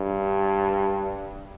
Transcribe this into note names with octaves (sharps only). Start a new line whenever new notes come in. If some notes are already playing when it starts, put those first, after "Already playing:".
Already playing: G2